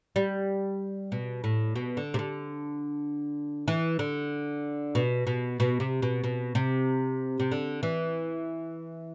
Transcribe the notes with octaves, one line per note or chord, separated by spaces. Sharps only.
G3
B2
A2
B2
D3
C3
D3
E3
D3
B2
B2
B2
C3
B2
B2
C3
C3
D3
E3